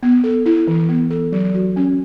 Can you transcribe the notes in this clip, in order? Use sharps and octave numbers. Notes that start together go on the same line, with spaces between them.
B3
A4
E4
E3
B3
A4
F#3
F#4
C#4